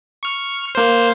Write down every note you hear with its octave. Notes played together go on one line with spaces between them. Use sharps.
C#6 F6
A#3 C5